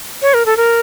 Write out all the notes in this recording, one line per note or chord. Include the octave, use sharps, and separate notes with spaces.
C#5
A#4
A4
A#4